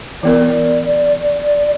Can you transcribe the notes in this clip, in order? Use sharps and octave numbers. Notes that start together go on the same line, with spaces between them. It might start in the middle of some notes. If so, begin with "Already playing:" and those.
E3 B3 A#4 D5